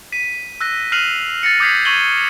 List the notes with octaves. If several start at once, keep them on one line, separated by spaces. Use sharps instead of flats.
B6 D#7
E6 F#6 A#6
F6 F#6 C7 D#7 F7 F#7
A6 A#6 C#7
D6 D#6 G6 G#6 B6 C7
C#6 G#6 D#7 F#7 G7